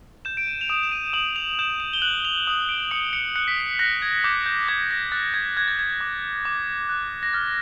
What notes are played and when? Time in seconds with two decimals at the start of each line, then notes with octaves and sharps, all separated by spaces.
0.25 G6 E7
0.37 D7
0.47 D#7
0.61 F7
0.69 D#6 E7
0.83 E7
0.92 D#7
1.13 D#6 F#7
1.36 F7
1.59 G6 E7
1.80 E7
1.93 G7
2.02 F#6 F#7
2.25 F7
2.47 D#6
2.69 D7
2.91 D#6 C#7
3.13 C#7
3.36 F#6 C#7
3.48 B6
3.57 C7
3.79 F#6 A#6
4.02 G#6
4.24 D6 G6
4.46 G6
4.68 D6 G#6
4.91 A#6
5.12 F#6 A6
5.34 G#6
5.57 F#6 G#6
5.68 A6
5.79 G#6
6.01 D6
6.45 D6
6.89 F#6
7.23 A#6
7.33 F6 A6